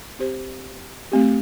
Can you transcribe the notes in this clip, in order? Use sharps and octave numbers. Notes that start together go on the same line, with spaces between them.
C4 G4 C5
A3 C4 G4